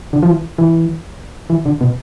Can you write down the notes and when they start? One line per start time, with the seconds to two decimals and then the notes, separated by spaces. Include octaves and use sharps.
0.13 D3
0.23 F3
0.28 E3
0.58 E3
1.50 E3
1.65 D3
1.81 B2